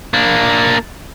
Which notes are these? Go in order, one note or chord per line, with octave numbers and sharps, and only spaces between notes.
A#3 D4